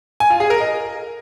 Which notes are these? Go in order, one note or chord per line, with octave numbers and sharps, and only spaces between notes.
G#5
F4
G#4
A#4
D#5